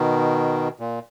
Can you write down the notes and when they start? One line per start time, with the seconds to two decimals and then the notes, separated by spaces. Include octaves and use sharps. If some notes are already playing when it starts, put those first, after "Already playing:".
Already playing: B2 D#3
0.80 A#2